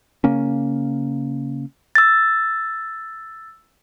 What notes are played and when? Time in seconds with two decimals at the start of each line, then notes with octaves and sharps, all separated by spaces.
0.24 C#3 A#3 C#4
1.95 E6 A6